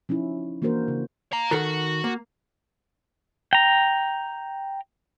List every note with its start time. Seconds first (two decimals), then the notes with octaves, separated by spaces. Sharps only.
0.09 F3 C#4 D#4 E4
0.62 E3 A#3 D4 F#4 A#4 C5
0.88 C#3
1.33 F5 A#5
1.51 D#3 F#4 A4 A#4 F#5
2.04 A#3
3.53 G5 A#5